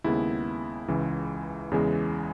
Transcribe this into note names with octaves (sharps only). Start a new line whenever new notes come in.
D#2 C#3 G#3 B3 E4
C#2 C#3 E3
E2 C#3 E3 G#3